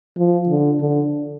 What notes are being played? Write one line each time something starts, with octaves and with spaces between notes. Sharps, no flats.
F3
D3
D3